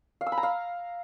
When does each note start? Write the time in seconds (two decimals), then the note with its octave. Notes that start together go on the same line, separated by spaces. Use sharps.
0.21 F5
0.26 E6
0.32 B5
0.38 A#5
0.43 F5